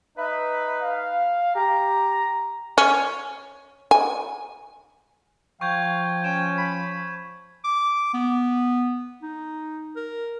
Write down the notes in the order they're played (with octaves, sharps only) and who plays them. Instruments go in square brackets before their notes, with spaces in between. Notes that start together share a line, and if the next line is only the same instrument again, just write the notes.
[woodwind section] D#4 B4 [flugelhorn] E5
[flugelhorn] F5
[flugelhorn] G4 [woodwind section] A#5
[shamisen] C#4
G#5
[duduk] F3 [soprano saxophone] F5 [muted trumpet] G5 [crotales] C#6 G6 G#6
[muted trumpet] C#4 [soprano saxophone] G5 [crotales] E7
[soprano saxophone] B5
[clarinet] D6
B3
D#4
A#4